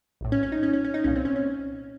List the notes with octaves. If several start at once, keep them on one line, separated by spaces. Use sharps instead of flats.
A#1 A2
C#4
C#4
D#4
C#4
C#4
C#4
D#4
C2 A#2 C#4
C4
C#4
C#4